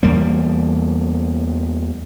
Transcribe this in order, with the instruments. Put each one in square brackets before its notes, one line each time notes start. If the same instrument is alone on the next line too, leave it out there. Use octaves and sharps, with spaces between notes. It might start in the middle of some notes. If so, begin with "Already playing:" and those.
[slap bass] E2 G3 A#3